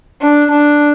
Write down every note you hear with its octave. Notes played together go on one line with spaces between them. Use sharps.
D4
D4